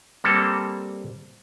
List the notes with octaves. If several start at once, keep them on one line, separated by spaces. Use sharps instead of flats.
G3 A#3 C4 A4